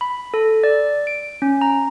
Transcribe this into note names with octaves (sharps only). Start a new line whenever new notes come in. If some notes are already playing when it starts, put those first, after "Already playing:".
B5
A4
D5
D7
C#4
A#5